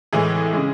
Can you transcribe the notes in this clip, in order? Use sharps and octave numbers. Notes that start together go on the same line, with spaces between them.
A2 E3 G#3 G#4
C#3 G#3